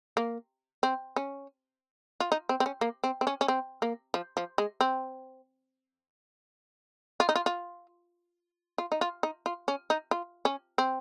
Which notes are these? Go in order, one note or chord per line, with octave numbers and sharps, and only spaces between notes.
A#3
C4
C#4
F4
D#4
C4
C4
C#4
A#3
C4
C4
C#4
C#4
C4
A#3
F3
F3
G#3
C4
F4
D#4
F4
F4
F4
D#4
F4
D#4
F4
C#4
D#4
F4
C#4
C4